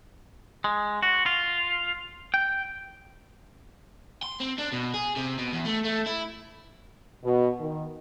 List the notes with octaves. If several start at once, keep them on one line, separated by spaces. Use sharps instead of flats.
G#3
F#4
F4
G5
C6
C4
D4
B2
G#4
C3
B2
E2
A3
A3
E4
B2
D#3